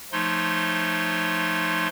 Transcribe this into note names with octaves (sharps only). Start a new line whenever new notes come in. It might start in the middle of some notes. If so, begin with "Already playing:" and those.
F3 A3 D#4 C#5 C6